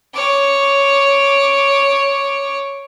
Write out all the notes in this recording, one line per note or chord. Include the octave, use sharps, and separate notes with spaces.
C#5 D6